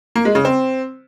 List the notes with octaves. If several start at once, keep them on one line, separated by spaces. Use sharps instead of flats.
A#3
G#3
C#3
C4